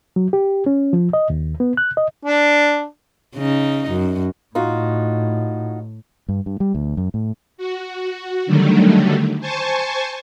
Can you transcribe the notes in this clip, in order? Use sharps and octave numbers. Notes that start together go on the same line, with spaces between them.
F#3
G4
C#4
F3
D#5
D#2
B3
F#6
D#5
D4
C#3 D#4
F#2
A2 D#4 F4 F#4
G2
G2
G3
D2
F#2
A2
F#4
D3 D#3 F#3 G3 A3
C5 G#5 A5 C#6